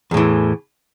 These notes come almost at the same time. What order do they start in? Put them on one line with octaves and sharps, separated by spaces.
E2 A2 E3